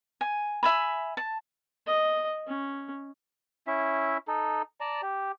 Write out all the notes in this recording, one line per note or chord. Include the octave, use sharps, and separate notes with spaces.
G#5
E5 G#5 B5
A5
D#5
C#4
C#4 E4 E5
D#4 A4
D5 A5 A#5
G4